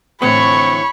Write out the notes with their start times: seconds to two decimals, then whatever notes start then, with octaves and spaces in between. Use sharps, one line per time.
0.22 A2 D3 E3 C4 C#5 B5 C#6